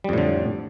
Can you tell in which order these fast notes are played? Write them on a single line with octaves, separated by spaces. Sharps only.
G3 F2 A2 D3